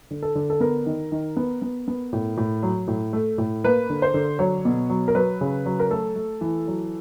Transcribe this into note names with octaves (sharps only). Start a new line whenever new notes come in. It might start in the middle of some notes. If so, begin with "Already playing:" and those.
D3
A4
D3
A4
B3 A#4
D#3
D#3
B3
B3
B3
A2
A2
F#3
A2
A3
A2
A#3 B4
D3
C5
D3
F#3 C#5
B2
F#3
A#4
F#3 B4
C#3
F#3
A#4
A3 A4
A3
E3
F#3